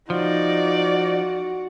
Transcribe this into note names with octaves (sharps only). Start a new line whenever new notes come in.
F3 D#4 F#4 D5